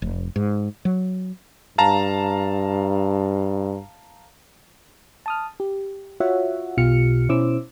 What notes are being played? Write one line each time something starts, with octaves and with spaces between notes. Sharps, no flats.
F1
G#2
F#3
G2 F5 A5 A#5
A5 D#6 F6
G4
F4 F#4 C#5 E5 F#5
B1 B2 F4 G4 F6 C#7
B2 C#4 E4 C5 D6 E6